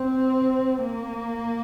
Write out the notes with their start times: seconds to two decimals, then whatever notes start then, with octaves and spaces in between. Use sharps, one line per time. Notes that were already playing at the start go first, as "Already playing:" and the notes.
Already playing: C4
0.81 A#3